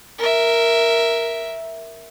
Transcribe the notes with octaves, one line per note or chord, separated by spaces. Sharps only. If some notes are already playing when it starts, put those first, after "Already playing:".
A#4 E5